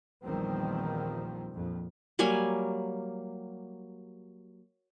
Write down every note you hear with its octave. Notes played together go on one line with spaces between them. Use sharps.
A#1 E2 D#3 F3 G3 C4
A#1 F2
F#3 G3 A#3 G#5